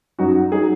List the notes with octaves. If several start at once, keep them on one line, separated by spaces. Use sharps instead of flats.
F#2 F#3 D#4 F#4
F#3 D#4 G#4